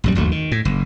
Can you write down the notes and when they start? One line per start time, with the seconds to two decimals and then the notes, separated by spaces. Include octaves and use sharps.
0.04 A#1 F#2 G3
0.15 G1 D#2 F#3 A3
0.32 D#3
0.52 A2
0.65 F#1